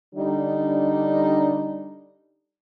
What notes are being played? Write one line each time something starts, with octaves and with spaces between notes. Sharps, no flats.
D3 G3 D4 D#4